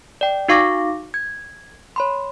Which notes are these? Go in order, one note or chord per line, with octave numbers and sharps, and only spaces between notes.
D5 G5
D#4 F#4 F5 C#6 D6 A#6
G#6
C#5 B5 C6